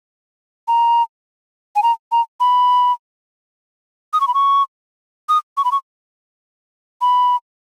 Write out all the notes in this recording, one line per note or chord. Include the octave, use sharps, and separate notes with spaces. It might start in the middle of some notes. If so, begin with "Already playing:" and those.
A#5
G#5
A#5
A#5
B5
D#6
C#6
B5
C#6
D#6
C#6
B5
C#6
B5